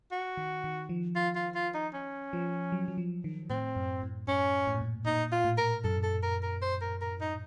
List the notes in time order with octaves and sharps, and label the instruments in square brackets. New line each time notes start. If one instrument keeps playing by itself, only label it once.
[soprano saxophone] F#4
[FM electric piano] D#3
D#3
F3
[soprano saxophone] F4
F4
F4
D#4
C#4
[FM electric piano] F3
F#3
F#3
F3
D#3
[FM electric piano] A2 [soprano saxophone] C4
[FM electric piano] F#2
A2
[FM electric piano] F#2 [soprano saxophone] C#4
[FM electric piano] A2
A#2
A2
[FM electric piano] A#2 [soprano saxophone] D#4
[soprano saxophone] F4
[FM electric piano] A2
[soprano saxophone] A#4
[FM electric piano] F#2 [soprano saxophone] A4
[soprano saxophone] A4
A#4
A#4
C5
A#4
A#4
D#4